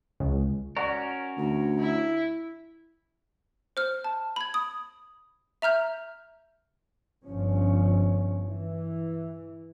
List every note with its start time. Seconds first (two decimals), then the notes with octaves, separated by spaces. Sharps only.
0.20 C#2
0.76 C#4 F#4 A#4 D5 F#5 C#6
1.37 D2
1.80 E4
3.77 C5 F6
4.04 A5
4.36 B5 G#6
4.54 D#6
5.62 E5 A#5 F6 G6
7.24 G1 G2 F3 C#4
8.45 E3